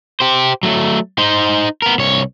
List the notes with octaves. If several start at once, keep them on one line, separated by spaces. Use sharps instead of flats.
G4 C5
F#3 A3
D#4 C5
B3 A#4
C2 C#5